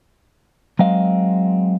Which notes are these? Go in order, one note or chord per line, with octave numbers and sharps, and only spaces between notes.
F#3 G#3 C4 D#5 F5